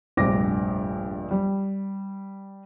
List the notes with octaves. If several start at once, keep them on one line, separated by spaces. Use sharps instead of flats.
F1 A#1 G2 D6 A#6
G3